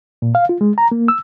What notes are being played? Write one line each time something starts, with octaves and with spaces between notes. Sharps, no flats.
A#2
F5
F4
G#3
A#5
A#3
E6